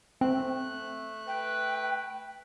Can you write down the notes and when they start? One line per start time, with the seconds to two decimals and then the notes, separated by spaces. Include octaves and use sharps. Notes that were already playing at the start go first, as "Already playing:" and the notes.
0.21 A3 C4 F#6
1.28 B4 G5